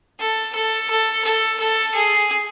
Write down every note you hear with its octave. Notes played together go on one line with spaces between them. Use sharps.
A4
A4
A4
A4
A4
G#4